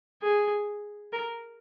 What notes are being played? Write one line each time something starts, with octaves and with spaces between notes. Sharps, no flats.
G#4
A#4